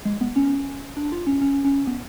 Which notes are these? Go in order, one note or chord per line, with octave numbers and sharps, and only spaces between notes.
G#3
B3
C#4
D4
F4
C#4
C#4
C#4
B3